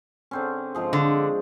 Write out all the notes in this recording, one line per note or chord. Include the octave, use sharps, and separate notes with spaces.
D3 C4 C#4
G#2 F3 G#4
D3